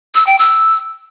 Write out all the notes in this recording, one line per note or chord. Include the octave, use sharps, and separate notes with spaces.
E6
G5
E6